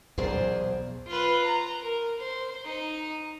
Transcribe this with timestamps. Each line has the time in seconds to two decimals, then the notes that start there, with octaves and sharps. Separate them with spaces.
0.18 B1 E2 A#2 G#4 C5 D5
1.07 F4 B4
1.45 A#5
1.82 A#4
2.19 C5
2.66 D#4